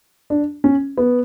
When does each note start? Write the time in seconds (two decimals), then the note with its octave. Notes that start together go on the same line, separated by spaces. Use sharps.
0.30 D4
0.64 C#4
0.98 B3